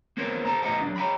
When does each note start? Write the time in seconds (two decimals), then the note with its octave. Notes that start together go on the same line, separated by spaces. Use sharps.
0.17 A#3 B3 C#4 A#4 C5
0.45 A4 C5 A5 A#5
0.62 B1 A2 B3 D#5 F#5 A#5
0.82 F#3 D4
0.96 C#5 E5 G5 A#5 B5